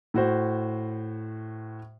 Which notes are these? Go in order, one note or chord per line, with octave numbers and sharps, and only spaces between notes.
A2 F#4 C5